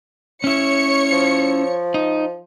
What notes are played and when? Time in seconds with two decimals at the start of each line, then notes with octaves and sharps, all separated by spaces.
0.44 C#4 E4 C#5 C#7
1.12 F3
1.94 D#4